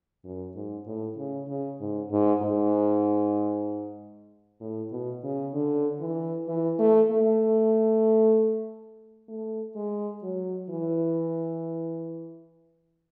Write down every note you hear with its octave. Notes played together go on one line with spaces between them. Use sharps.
F#2
G#2
A2
C#3
C#3
G#2
G#2
G#2
A2
B2
C#3
D3
E3
E3
A3
A3
A3
G#3
F#3
E3